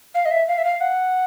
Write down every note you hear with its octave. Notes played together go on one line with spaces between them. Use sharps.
F5
D#5
E5
F5
E5
F5
F#5